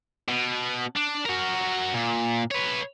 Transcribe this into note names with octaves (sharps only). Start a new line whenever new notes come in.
B2
D4
F#4 A#4
A#2
B4 C#5